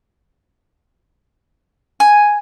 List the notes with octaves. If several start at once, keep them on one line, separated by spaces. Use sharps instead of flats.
G#5